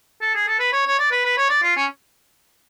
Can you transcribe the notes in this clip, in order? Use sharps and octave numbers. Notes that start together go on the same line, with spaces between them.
A4
G#4
A4
B4
C#5
C#5
D5
B4
B4
C#5
D5
F4
C#4